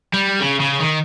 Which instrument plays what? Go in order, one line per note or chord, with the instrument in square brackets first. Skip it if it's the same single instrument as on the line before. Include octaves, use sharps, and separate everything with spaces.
[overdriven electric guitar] G3
C#3
C#3
D#3